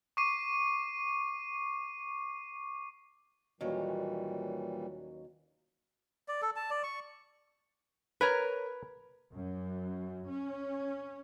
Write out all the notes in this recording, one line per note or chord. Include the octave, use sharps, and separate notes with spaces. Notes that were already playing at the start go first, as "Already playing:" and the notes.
C#6 D6 C7 D#7
D#2 A#2 E3 F#3 G3 C#4
D5
A4
A5
D5
C#6
A#4 B4 C#5 A#5
F#2
C#4